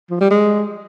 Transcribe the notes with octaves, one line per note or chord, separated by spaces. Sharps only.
F3
G3
G#3